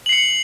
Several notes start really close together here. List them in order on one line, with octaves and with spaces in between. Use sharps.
F#7 C7 C#7